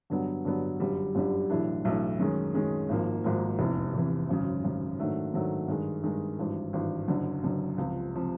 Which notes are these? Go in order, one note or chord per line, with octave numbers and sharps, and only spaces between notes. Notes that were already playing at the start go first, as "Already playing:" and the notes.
G2 D3 F#3 B3
G2 D3 F#3 B3
G1 F#2 D3 G3
G1 F#2 D3 G3
B1 A2 E3 A3 D4
B1 A2 E3 A3 D4
F#2 D#3 G#3 C#4
F#2 D#3 G#3 C#4
G#1 G#2 F3 A#3
G#1 G#2 F3 A#3
F1 E2 C3 E3
F1 E2 C3 E3
G#1 F#2 C#3
G#1 F#2 C#3
G#2 D#3 F#3 A3 D4
G#2 D#3 F#3 A3 D4
G2 D#3 G#3
G2 D#3 G#3
G#1 G2 E3
G#1 G2 E3
F#1 F#2 D3
F#1 F#2 D3
C#2 C3 F3
C3 F3